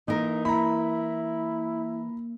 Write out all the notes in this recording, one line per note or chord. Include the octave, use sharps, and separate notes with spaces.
E3 A#3 D#4 A#4
A#3 E4 A#5 B5